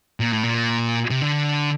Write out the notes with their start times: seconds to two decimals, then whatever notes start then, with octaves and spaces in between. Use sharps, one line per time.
0.20 A#2
0.32 A2
0.43 A#2
1.10 C3
1.22 D3